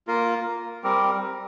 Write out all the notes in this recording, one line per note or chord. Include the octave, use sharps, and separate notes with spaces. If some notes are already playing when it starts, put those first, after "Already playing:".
A#3 F4 A#4 F5
G3 C4 G4 A#4